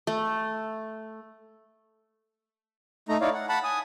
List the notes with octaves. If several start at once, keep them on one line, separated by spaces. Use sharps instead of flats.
A3
A3 D#4 A#5
D#4 E4 C#5 D5 F5
F#5
F#5 A5 B5
G#5 D#6